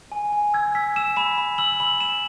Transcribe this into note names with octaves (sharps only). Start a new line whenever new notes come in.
G#5
G#5
E6 G#6
E6 B6
E6 E7
B5 E7
B5
E6 F#7
B5 F#7
B5 E7